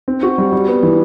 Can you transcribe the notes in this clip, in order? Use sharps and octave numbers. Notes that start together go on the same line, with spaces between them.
C4
F#4
G3
G3
B3
E3